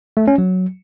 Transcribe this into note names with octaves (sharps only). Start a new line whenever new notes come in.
A3
C#4
F#3